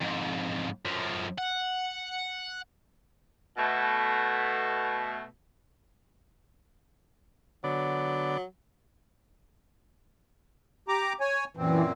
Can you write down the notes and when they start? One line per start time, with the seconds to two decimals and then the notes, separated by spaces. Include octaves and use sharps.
0.01 F2 G#2
0.85 F#2 F3
1.38 F#5
3.56 B2 A3
7.64 D3 F#3 B3 D5
10.88 G4 A#5 D6
11.20 C#5 G#5
11.57 F#2 A#2 E3 C4